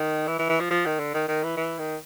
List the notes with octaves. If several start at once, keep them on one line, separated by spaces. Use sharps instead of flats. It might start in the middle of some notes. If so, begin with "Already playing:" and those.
Already playing: D#3
E3
E3
E3
F3
F3
D#3
D3
D#3
D#3
E3
E3
D#3